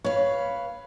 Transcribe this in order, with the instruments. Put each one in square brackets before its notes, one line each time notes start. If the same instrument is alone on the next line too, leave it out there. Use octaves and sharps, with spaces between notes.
[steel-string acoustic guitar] B4 F5 [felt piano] C#5